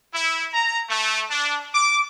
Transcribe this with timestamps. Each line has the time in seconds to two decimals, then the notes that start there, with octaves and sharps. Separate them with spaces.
0.13 E4
0.53 A#5
0.89 A3
1.30 D4
1.74 D6